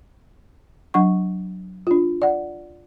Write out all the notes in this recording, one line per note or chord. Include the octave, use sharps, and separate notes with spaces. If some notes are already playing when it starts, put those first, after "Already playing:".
F#3 D4 F#5 C#6
D4 F4
D5 F#5